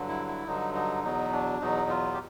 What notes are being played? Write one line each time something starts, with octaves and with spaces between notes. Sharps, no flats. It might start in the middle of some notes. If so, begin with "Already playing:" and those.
Already playing: G2 D3 F#3
E4
E4
G2 D3 F#3 D#4
D#4
E2 B2 F#3 D#4
D4
E2 B2 F#3 D#4
F4
G4